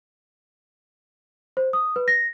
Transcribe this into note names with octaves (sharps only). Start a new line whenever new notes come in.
C5
D#6
B4
A#6